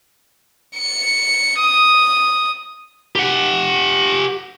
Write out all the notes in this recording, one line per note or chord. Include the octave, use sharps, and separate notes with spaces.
C#7
D#6
G4 F#5